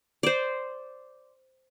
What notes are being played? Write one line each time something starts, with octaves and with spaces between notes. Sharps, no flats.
C5 D5